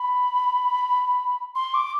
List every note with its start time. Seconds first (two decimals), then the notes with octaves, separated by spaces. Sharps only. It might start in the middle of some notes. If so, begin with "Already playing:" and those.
Already playing: B5
1.55 C6
1.74 D6